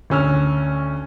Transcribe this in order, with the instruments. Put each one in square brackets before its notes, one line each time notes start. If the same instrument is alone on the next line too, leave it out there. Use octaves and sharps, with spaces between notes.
[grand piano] D2 C#4 E6 F6